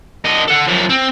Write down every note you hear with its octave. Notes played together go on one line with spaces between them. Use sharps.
D3 D#5
A4 F#5
F#2 F3
C4